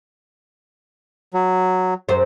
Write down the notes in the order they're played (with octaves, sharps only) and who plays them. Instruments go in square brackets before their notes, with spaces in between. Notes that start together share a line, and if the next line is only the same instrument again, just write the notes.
[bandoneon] F#3
[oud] F#2 C5